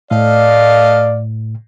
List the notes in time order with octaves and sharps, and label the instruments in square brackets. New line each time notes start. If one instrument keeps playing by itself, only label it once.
[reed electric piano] A2 [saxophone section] A3 D#5 F5 [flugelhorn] D5